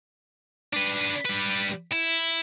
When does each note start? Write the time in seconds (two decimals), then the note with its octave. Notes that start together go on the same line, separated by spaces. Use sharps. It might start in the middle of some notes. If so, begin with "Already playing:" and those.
0.73 D4 B4
1.26 G3 B4
1.92 E4